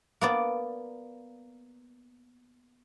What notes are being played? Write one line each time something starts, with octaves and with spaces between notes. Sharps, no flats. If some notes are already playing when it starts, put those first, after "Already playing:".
A#3 B3 D5